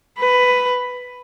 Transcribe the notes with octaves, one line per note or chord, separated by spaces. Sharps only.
B4